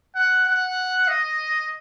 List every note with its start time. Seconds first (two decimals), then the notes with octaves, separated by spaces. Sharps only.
0.16 F#5
0.47 F#5
1.08 D#5